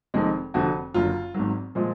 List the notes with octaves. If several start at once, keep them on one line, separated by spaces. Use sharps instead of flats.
F1 F2 D#3 G#3
F1 F2 D3 F#4
F#1 F#2 D3 F4
G#1 G#2 D#3 F#3
A#2 F3 G#3